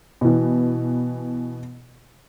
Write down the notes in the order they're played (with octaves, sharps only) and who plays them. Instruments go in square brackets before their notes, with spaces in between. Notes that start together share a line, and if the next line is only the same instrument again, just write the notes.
[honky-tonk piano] B2 E3